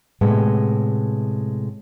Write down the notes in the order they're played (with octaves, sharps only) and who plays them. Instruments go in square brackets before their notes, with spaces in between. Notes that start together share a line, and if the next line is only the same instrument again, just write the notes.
[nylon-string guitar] A2 C3 G#3 B3